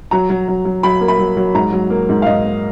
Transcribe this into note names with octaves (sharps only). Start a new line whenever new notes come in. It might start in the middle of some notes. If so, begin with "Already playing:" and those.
F#3 A#5
F#3
F#3
F#3
F#3 B5
A#3
B5
F#3
F#3
G#2 A#5
F#3
A#3
G#2
F5
G#2 D#5
A#3